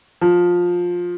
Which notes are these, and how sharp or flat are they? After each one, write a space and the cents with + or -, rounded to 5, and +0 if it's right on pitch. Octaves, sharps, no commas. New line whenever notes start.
F3 +15